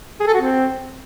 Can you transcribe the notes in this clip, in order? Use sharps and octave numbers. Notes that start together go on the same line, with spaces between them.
G#4
A4
F#4
C4